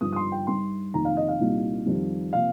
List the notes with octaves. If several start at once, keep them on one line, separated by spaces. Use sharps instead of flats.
G1 G2 F3 D#4 D#6
D#6
C6
G5
G2 G3 D#4 C6
F1 F2 D#3 A#3 D#4 A#5
F5
D#5
F5
C2 A#2 G3 A#3 D#4
F2 D#3 G3
C3 F3 A#3 F5